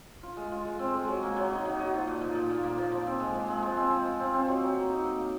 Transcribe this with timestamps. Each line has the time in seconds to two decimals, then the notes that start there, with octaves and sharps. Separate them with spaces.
0.23 F4
0.37 G#3
0.52 F4
0.65 G#3
0.79 C4
0.94 G#3
1.07 F#3
1.23 A#3
1.36 F#3
1.51 D#4
1.65 F#3
1.79 D#4
1.94 F3
2.07 A#2
2.21 A#2
2.35 A#2
2.50 A#2
2.64 A#3
2.78 F3
2.92 F3
3.07 C4
3.20 G#3
3.35 F3
3.48 G#3
3.63 F3
3.77 C4
3.91 F3
4.06 F4
4.20 C4
4.34 C4
4.47 F#3
4.62 F#3
4.77 A#3
4.90 D#4
5.04 A#3
5.18 A#3